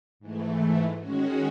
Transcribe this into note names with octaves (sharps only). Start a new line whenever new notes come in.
G#2 E3 A3
D#3 G#3 C#4 F#4